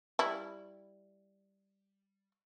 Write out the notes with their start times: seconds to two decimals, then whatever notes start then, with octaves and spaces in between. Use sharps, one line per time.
0.19 G3 E4